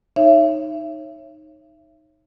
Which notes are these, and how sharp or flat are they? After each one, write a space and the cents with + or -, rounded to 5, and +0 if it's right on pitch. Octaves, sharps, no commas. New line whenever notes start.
D#4 +0 C#5 -20 E5 +30